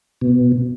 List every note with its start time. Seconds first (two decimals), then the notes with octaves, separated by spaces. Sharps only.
0.21 B2